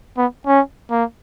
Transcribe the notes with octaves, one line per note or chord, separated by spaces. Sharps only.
B3
C#4
A#3